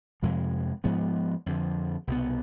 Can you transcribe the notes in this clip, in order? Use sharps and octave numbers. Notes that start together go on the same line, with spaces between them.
F2 C3 F3 G#3
G#2 F3 G#3 B3
F2 D3 F3
C2 B2 B3